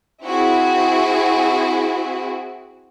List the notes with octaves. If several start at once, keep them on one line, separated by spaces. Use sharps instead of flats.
C4 E4 F#4 G#4